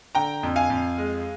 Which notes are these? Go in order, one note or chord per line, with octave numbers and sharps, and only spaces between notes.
D3 G5 A#5
F2
F5 G#5
F2
G#3